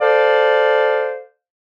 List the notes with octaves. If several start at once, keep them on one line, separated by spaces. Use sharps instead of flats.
A4 C5 D5 F5